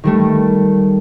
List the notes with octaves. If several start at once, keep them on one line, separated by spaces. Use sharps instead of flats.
D#3 G3 A3